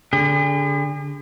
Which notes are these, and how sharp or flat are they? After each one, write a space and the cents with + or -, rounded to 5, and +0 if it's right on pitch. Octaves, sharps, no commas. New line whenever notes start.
D3 -25 G#4 -45